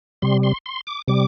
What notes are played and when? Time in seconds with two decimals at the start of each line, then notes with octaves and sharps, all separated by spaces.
0.22 C3 G3 C6
0.43 C6
0.66 C6
0.87 D6
1.08 C3 G3 D6